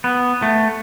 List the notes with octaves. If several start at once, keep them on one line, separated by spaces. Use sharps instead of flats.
B3
A3